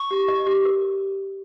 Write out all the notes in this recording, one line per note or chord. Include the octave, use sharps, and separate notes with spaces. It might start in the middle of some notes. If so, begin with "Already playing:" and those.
Already playing: C#6
G4
D#5
G4
A#4